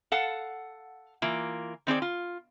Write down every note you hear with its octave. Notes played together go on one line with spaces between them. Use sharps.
A4 F5 F#5 A5
E3 A#3 F4
D#3 C4 G#4 D5
F4